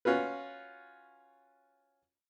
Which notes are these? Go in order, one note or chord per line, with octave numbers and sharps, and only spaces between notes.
C#4 F4 F#4 B4